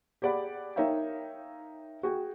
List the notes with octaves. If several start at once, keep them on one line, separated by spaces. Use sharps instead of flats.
G4 G#4 D5 F#5 B5
D#4 A#4 C#5 E5 F5 G5
F#4 G#4 G5